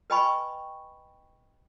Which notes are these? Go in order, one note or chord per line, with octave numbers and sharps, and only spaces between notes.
B4 D#5 G5 G#5 B5 C#6